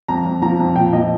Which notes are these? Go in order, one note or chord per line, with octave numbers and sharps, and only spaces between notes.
F2 A#5
F2
F3 A#5
F2
A#2 G5
F3 D#5